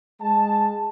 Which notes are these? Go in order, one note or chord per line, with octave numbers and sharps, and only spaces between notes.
G#3 A5